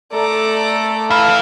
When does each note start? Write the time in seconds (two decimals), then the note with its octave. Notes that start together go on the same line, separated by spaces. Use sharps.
0.13 A3 A4 D5 A#5
1.10 E4 B4 F5